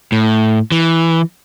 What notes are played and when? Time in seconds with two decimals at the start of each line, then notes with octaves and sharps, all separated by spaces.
0.12 A2
0.72 E3